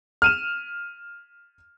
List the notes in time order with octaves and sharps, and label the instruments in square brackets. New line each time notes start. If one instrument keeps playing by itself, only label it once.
[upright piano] F6 D#7 E7